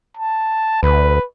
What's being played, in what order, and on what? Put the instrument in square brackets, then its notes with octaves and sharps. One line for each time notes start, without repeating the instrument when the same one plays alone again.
[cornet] A5
[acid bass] D2 [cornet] B4